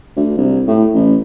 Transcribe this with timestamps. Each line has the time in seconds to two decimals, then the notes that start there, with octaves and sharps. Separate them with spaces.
0.16 D2
0.37 C2
0.67 A2
0.94 A1